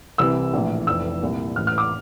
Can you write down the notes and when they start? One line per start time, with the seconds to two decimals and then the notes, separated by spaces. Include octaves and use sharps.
0.18 C2 C3 E3 E6
0.53 A#1 A2 E3
0.87 F1 F2 E3 E6
1.21 C2 A#2
1.56 A1 A2 E3 F6
1.67 F6
1.78 D6